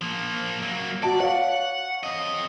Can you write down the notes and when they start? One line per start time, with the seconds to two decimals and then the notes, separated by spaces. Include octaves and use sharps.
0.01 F3 A#3
0.62 F#3 A#3
1.03 F#4 D5 A5
1.20 C#5 F5 F#5
2.03 F2 D#5